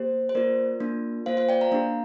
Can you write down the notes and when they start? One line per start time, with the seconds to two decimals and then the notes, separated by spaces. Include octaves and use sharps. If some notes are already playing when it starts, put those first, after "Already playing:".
Already playing: A#3 G4 C5
0.29 C5
0.35 A#3 F4 A#4 D5
0.80 A#3 D4 F4
1.26 A#3 F4 C5 F5
1.37 C5 F5
1.49 D5 G5
1.61 F5 A#5
1.72 A#3 D4 G4 F5 A#5